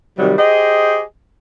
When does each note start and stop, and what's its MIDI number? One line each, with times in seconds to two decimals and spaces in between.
0.18 0.33 48
0.18 0.33 51
0.18 0.33 54
0.18 0.33 55
0.38 1.01 67
0.38 1.01 68
0.38 1.01 72
0.38 1.01 75